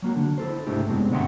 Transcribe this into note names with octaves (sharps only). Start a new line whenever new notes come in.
F#3 A#3 F#4
D3
E4 A4 C5
C2 G#2 A3 D4 E4 G4
F#2 B2 G#3 C4
G2 D3 A3 F#5 G5 C6